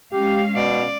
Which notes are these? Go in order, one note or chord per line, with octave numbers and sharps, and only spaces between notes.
G#3 C#4 G4 F5
B2 D5